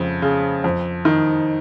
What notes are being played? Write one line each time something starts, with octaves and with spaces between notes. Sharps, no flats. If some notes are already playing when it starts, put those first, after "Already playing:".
Already playing: F2 C#3
C#3
F2
D#3